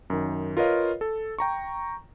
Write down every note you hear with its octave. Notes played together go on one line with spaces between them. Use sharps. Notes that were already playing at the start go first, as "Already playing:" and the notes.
F#2 D#3
F4 A#4 B4 C#5 D#5 F5
A4
G5 A#5 C#6